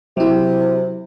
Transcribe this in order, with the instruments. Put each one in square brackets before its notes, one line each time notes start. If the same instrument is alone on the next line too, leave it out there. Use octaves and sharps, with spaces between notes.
[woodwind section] C3 [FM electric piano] F#3 E4